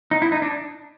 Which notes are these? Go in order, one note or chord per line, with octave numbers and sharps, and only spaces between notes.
D#4
E4
D#4
D4